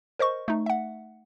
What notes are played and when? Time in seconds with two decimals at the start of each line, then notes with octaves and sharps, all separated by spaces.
0.19 A#4 C5 D#5 C#6
0.48 A3 D#4
0.66 E5 F#5